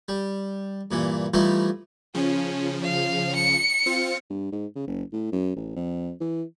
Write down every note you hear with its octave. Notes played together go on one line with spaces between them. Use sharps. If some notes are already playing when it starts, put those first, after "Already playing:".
G3
G2 A#2 E3
E3 F3 G3 A3 D#4 E4
C#3 F3 C#4
F5
C#7
C4 F4
G2
G#2
C#3
F#1
A2
F#2
A1
F2
E3